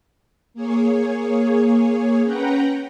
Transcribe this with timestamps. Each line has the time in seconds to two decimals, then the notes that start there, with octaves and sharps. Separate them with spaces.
0.54 A#3 G#4 C#5
2.24 C#4 B4 F#5 G5 A#5